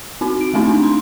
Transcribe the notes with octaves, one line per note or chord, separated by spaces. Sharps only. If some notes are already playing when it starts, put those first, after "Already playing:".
C4 D#4 F#4
D7
G#3 A3 C4 D#4 E4
D4
C6